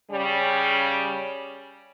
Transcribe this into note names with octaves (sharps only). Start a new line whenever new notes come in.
C#3 G3 C#4